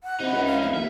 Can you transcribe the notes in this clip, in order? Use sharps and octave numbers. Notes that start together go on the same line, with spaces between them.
F#5
C3 D#4 E4
C#2
F5
F1 F5
D#2 E5